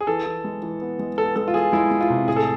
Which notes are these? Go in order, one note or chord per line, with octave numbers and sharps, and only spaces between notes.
G#4
E3 A4
E3
G#3
E3
B3
G#3
B3 A4
G#3 A4
F4
E3 G#4
G#3 E4
G#3
F4
C3
A2 G#4
A4